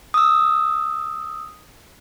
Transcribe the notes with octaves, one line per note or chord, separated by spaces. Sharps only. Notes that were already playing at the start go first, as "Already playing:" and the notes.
D#6 E6